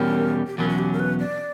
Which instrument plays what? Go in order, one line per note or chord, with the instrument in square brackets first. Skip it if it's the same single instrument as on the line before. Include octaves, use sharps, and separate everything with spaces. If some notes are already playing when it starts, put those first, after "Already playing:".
Already playing: [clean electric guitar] E2 B2 G3 C#4 G4 [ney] A#4
[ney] G4
[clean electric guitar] E2 B2 F#3 C#4 [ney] A#4
[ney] F#4
G4
A#4
B4
D5